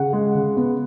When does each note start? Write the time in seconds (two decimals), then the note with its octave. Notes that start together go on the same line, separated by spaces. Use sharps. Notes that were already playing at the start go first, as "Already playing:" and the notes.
Already playing: C#3 F#5
0.13 G#3
0.35 C#3
0.57 B3